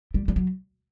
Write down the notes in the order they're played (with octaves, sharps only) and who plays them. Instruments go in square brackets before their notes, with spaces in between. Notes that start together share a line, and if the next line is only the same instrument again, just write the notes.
[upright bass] G3
G3
F#3